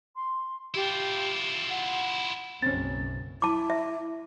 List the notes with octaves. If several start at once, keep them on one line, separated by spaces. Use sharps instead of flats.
C6
E4 F4 G4
F#5
F#1 B1 F#2 C4 C#4 A6
E4 A5 D6
E5